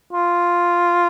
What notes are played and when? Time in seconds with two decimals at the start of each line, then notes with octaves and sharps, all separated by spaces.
0.13 F4